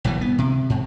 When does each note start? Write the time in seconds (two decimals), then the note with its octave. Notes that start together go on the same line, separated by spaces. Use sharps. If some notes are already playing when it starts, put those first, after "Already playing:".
0.04 F#1 G2 B2 E3
0.21 B3
0.38 C3
0.70 G#2